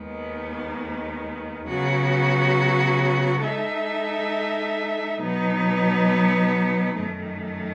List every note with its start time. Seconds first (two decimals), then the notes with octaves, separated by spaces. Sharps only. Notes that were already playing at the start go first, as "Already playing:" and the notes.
Already playing: D#2 D#3 G#3 B3
1.66 C#3 F#3 B3 F#4
3.43 G#3 D#4 A4 E5
5.20 B2 F#3 B3 D#4
6.99 F#2 D#3 A3